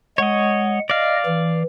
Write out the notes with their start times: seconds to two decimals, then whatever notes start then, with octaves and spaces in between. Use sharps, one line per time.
0.18 G#3 C#5 D#5 F#5
0.90 D5 D#5 F5
1.26 E3